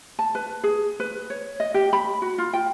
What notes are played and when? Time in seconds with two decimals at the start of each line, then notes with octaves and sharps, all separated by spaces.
0.19 A5
0.35 B4
0.64 G#4
1.00 B4
1.30 C#5
1.60 D#5
1.74 G4
1.93 B5
2.22 F#4
2.38 F4
2.53 G5